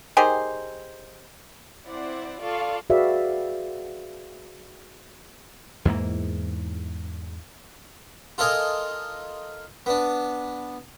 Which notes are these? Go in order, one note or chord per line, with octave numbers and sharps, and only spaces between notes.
D#3 G4 G#4 C5
C4 E4 C5 D5 F#5
F4 A4 D5 F5 C#6
F#4 G#4 B4 D5 E5 F5
E2 G#2 E3 A#3
F4 A4 A#4 D#5 G#5
B3 D4